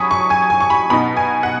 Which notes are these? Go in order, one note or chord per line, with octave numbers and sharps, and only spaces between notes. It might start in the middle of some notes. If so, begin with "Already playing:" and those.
Already playing: F#3 G#5 B5 C#6 D#6
C#6
G#5
G#5
C#6
B5
B2 B3 D#4 B5
G#5
F#5